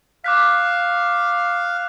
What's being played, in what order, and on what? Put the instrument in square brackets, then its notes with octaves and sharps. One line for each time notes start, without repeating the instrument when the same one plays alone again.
[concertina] F5 [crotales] D6 F#6 B6